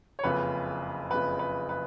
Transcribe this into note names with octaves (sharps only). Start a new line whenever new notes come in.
C#5
F#1 F2 C#3 B4
F#1 F2 C#3 B4
B4
B4